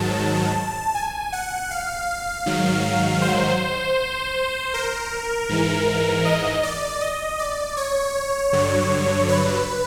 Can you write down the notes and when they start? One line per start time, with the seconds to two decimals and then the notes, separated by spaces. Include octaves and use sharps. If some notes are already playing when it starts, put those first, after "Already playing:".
Already playing: G#2 D#3 F#3 A5
0.94 G#5
1.32 F#5
1.71 F5
2.46 G#2 D#3 F#3
3.22 C5
4.74 A#4
5.49 G#2 E3
6.25 D#5
6.63 D5
7.01 D#5
7.39 D5
7.77 C#5
8.53 G2 D3 F#3
9.28 B4